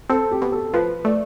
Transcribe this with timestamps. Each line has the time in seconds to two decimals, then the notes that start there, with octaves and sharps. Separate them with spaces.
0.09 C4 A4
0.31 G4
0.42 B2
0.52 A4
0.73 F3 B4
1.05 A3 D5